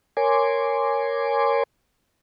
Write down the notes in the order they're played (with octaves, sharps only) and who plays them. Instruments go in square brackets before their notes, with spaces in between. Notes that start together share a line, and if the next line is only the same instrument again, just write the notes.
[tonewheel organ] A#4 C#5 G#5 C6 D6